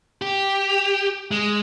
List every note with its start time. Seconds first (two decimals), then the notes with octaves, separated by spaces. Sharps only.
0.22 G4
1.31 G#3